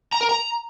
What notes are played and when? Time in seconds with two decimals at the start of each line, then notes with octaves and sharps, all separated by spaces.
0.12 A#5
0.21 A#4
0.29 A#5